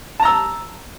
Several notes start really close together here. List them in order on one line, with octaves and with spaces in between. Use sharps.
A5 A#5 E6